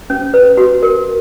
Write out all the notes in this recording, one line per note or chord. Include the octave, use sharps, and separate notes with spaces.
C#4
B4
F#4
A#4